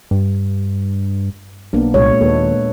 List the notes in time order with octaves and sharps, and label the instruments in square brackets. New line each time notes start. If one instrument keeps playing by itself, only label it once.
[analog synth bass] G2
[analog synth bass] B1 [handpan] A#3 B3 D4
[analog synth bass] C2 [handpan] A#2 G#3 C#5
[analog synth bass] D#2 [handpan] A4 B4